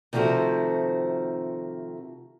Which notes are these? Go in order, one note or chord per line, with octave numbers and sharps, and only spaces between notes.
C3 D#3 F3 A3 F#4